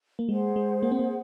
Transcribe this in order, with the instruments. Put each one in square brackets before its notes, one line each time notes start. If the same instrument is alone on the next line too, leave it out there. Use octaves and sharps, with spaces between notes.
[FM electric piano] A#3
[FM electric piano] G#3 [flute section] G#4 C5 F#5
[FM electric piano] G#3
A#3
C4
A#3